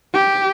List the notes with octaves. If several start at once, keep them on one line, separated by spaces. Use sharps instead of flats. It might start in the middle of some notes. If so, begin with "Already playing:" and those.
G4